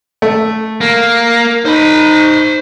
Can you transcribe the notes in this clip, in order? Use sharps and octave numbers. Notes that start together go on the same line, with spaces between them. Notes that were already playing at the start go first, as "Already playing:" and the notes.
A3
A#3
D#4 C5 B5